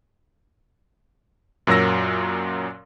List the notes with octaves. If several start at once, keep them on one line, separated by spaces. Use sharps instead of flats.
F#2 A#2 F#3 A#4 E6 A#6